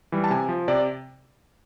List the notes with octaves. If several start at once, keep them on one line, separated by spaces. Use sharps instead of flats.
E3 G3
A5
C3 G#5
F3
C3 D5